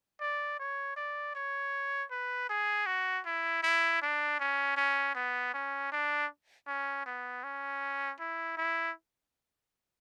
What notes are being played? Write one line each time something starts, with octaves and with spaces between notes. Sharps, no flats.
D5
C#5
D5
C#5
B4
G#4
F#4
E4
E4
D4
C#4
C#4
B3
C#4
D4
C#4
B3
C#4
E4
E4